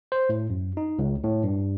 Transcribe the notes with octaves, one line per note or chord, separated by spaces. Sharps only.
C5
A2
F#2
D#4
C#2
A2
G2